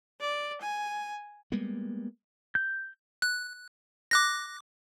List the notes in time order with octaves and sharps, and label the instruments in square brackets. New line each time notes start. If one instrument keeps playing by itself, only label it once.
[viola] D5
G#5
[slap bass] G3 G#3 A#3 B3
[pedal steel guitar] G6
[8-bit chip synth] F#6
D6 F#6 A#6